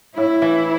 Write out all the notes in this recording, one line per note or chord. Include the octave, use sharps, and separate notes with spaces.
A2 E4
E3